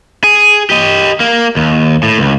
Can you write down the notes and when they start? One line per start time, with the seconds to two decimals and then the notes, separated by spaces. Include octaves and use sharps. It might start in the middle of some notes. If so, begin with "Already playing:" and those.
0.24 G#4
0.70 G4 D#5
1.20 A#3
1.56 D#2
2.03 A2
2.19 C#2